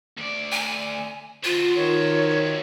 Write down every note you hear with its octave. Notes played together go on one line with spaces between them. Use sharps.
D2 D5
G#5
F4 F#4 C5
D#3 C#5